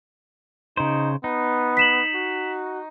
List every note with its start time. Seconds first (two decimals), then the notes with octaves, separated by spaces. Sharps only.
0.77 C#3 D#4 C5
1.24 B3 D#4
1.77 B6 E7 F#7
2.14 F#4